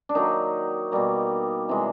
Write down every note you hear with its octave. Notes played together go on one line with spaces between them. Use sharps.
D4
D#3 F#3 A#3 D#4
B2 G3 A#3
C3 E3 G#3